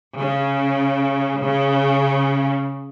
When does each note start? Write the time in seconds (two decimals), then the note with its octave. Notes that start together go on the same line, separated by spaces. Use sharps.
0.18 C#3
1.42 C#3